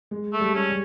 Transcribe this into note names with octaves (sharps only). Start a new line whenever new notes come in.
G#3
A3
G3
C#4
G3